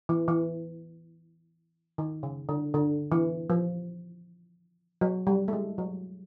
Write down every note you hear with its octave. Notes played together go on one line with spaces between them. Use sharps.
E3
E3
D#3
C#3
D3
D3
E3
F3
F#3
G3
A3
G#3
F#3